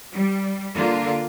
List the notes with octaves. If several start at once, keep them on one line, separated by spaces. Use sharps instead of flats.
G3
D3 A#3 F4